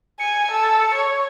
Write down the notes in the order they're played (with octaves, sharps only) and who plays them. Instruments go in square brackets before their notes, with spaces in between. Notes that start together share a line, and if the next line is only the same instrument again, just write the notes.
[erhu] G#5 [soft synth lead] C#7
[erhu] A4
C#5